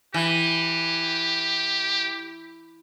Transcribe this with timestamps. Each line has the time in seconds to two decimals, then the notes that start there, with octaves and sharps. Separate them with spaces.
0.14 E3 G4